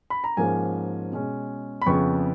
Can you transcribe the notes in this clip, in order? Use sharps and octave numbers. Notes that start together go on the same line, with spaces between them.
B5
A#5
G#2 F3 A#3 C#4 G#5
B2 G#3 C#4
B5
F2 C#3 F3 B3 C#6